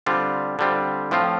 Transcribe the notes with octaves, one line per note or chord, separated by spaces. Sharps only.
D3 G3 C4 F4
D3 G3 C4 F4
A2 F3 C4 F4